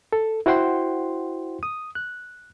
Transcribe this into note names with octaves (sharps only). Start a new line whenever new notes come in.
A4
E4 F#4 C5 F#5 G5 C6
D#6
F#6